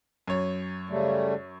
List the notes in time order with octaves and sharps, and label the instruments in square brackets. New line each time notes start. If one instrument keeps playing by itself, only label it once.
[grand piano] F#2 C#5
[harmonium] C#3 G3 A3